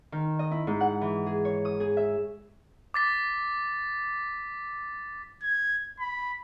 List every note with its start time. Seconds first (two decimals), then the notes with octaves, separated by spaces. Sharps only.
0.12 D#3
0.39 D#5
0.51 E4
0.67 G#2
0.80 F#5
1.01 E3
1.26 G#4
1.45 C#5
1.65 D#6
1.80 G#4
1.97 E5
2.94 D6 A6 B6
5.43 G#6
6.00 B5